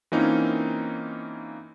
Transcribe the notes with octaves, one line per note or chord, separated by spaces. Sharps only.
E3 A#3 C4 C#4 D#4 F4